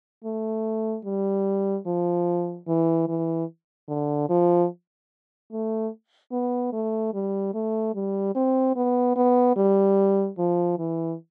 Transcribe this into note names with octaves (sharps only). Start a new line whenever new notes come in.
A3
G3
F3
E3
E3
D3
F3
A3
B3
A3
G3
A3
G3
C4
B3
B3
G3
F3
E3